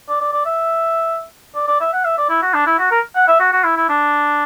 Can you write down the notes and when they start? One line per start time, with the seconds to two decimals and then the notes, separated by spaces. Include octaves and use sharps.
0.09 D5
0.21 D5
0.33 D5
0.46 E5
1.56 D5
1.68 D5
1.81 E5
1.93 F#5
2.05 E5
2.18 D5
2.29 E4
2.42 F#4
2.54 D4
2.66 E4
2.79 F#4
2.91 A#4
3.16 F#5
3.28 E5
3.40 F#4
3.53 F#4
3.64 E4
3.77 E4
3.89 D4